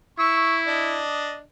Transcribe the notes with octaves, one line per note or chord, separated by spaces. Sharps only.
E4 C#6 E6
D4 D#5